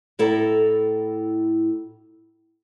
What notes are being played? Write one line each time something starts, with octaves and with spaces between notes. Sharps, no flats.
A2 E4 A4 A#5